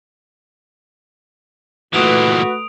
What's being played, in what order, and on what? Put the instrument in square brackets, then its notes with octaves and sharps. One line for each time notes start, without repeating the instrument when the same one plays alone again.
[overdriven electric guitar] A#2 E3 [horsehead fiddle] A3 B4 [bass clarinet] F#4 [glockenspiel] D#6 D7 F7